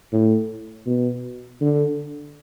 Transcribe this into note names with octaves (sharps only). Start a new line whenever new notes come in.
A2
B2
D3